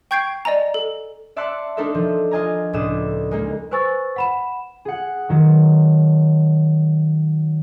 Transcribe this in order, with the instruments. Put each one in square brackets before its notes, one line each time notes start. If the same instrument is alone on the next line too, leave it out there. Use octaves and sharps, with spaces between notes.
[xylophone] G5 C#6 G6 G#6 C7 D7
D5 D#5 G#5 A#5
A4
[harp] D5 E5 A5 C6 F#6 C#7
D4 D#4 A4 A#4 E5
F3
F4 D#5 G#5 A#5
C#2 A2 A3 D4 D#6 E7
G#3 A#3 D#4
[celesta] B4 C5 G#5 C#6 E6 A6
F#5 B5 E7
[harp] G#4 F#5
D#3 F#3